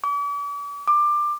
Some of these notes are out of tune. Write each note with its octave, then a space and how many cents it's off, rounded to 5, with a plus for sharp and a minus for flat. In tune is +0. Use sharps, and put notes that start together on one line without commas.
D6 -45
D6 +20